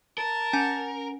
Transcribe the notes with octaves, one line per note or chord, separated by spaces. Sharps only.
A#4 A5
C#4 G#5